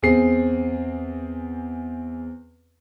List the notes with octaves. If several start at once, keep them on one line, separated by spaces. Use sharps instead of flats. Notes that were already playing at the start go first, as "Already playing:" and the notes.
E2 C4 G#4 C7